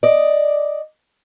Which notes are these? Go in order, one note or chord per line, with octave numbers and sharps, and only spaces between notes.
D5 D#5